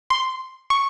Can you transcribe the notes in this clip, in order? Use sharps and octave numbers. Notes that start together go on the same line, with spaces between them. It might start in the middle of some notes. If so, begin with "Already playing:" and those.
C6
C#6